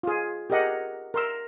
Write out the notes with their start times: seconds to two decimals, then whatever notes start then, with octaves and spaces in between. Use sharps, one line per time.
0.03 F4 G#4
0.50 G4 G#4 A#4 D#5 F#5
1.14 A#4 C6 E6